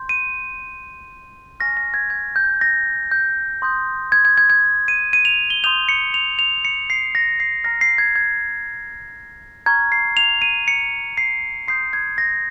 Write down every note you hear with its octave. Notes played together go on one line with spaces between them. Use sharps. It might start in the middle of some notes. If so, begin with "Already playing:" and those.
Already playing: C6 G6
D#7
G#5 C#6 F6 A#6
A#6
G#6
G#6
G6
A#6
G6
C6 D#6 G6
G#6
G#6
G#6
G#6
D#7
D#7
F7
G7
C6 D#6 G6 F7
C#7
F7
F7
C#7
C7
A#6
C7
A#5 F6 A#6
C7
G#6
G#6
A#5 C#6 F6 G#6
C7
F7
D#7
C#7
C7
C6 D#6 G6 C7
G#6
A#6